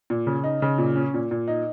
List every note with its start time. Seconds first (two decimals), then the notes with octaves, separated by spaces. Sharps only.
0.10 A#2
0.27 C#3
0.44 D#4
0.62 C#3
0.78 A#2
0.96 C#4
1.14 A#2
1.31 A#2
1.48 D#4